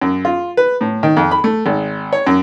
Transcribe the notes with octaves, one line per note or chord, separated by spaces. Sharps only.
F#2
F4
B4
A2
D#3
F2
B5
A3
G#1
C#5
F#2